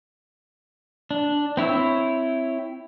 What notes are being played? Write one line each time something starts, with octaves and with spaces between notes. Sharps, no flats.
D4
C4 E4 C#5 E6